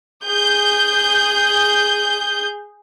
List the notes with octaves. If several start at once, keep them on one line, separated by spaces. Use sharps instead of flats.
G#4 G6